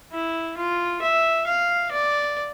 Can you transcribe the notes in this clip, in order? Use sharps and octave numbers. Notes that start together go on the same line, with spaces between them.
E4
F4
E5
F5
D5